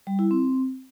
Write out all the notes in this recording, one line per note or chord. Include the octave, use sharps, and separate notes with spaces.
G3
E4
C4